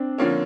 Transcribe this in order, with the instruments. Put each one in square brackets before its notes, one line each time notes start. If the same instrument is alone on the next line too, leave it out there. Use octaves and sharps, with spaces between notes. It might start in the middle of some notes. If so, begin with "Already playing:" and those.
Already playing: [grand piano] C4 D4
[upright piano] D3 F3 A#3 C#4